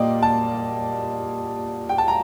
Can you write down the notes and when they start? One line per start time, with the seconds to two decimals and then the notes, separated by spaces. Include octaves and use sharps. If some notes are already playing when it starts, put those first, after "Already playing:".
Already playing: A#2 G3 A#3 D5 D#5 G5
0.23 A5
1.89 G5
1.98 A5
2.08 A#5